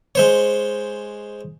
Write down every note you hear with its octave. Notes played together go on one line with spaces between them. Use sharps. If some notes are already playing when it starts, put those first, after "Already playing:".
G#3 C5 C#5